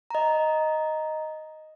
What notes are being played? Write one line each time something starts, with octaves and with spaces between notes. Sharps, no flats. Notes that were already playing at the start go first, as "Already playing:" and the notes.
D#5 A#5